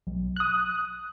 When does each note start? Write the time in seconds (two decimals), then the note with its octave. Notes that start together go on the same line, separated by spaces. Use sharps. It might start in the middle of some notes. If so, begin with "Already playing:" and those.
0.07 B1
0.36 D#6 F#6